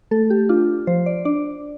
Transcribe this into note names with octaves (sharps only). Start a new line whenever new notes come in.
A3 A4
G4
D4 F4
F3 C5
D5
D4 D5